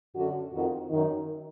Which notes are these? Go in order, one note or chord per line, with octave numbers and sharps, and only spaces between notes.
F#2 D3 F#4
F2 D#3 F#4
F#2 D#3 D#4